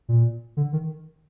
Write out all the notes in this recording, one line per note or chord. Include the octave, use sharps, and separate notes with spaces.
A#2
D3
D#3